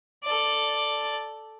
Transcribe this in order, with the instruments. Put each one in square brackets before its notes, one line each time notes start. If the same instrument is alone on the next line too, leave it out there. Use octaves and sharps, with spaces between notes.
[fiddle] A4 D5